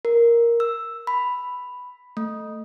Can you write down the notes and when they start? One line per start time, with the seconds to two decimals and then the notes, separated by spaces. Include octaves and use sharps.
0.05 A#4
0.60 E6
1.07 B5
2.17 A3